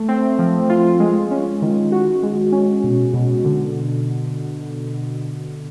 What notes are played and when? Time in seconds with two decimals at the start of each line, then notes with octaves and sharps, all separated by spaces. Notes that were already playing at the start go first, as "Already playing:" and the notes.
Already playing: A3
0.08 C4
0.39 F3
0.70 F4
1.00 G#3
1.31 C#4
1.62 D#3
1.92 F#4
2.23 G#3
2.52 C#4
2.84 B2
3.14 B2
3.45 D3